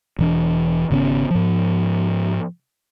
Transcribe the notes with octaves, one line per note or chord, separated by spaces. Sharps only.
E1 E3 D4
G#1 C#3 B3 C#4
G#2 F3